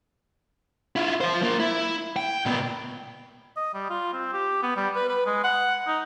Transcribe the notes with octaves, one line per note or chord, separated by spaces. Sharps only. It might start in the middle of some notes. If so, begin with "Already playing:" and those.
E4 F4
F4 C5
F3 A#3
E4
G5
A#2 B3
D#5
G3
F4
C4
G4
B3
G3
B4
B4
G#3
F#5
D#4